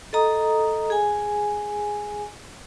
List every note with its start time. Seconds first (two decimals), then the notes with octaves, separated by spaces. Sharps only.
0.13 A4 D#5 A#5 D#6
0.90 G#4 G#5